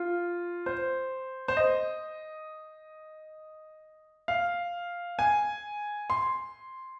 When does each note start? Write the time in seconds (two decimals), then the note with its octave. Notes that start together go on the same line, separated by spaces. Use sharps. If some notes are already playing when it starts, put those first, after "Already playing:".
Already playing: F4
0.66 C5
1.48 C5
1.57 D#5
4.28 F5
5.19 G#5
6.10 C6